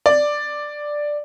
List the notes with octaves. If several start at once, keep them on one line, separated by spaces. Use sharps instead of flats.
D5